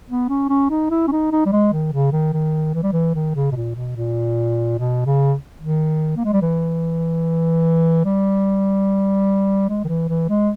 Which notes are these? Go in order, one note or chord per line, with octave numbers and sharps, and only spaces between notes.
B3
C#4
C#4
D#4
E4
C#4
D#4
D#4
G3
G#3
D#3
C#3
D#3
D#3
E3
G3
E3
D#3
C#3
B2
A#2
B2
A#2
B2
C#3
D#3
A#3
G#3
G3
E3
G3
G#3
D#3
E3
E3
G#3